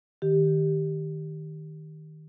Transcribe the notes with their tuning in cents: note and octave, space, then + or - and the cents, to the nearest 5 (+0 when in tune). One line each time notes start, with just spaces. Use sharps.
D#3 +0 G4 +0